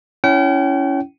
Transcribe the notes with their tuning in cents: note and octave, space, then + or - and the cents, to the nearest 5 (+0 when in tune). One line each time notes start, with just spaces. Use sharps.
C#4 +10 E4 +5 G5 -40